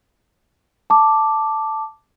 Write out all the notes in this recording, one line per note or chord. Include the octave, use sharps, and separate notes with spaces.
A5 D6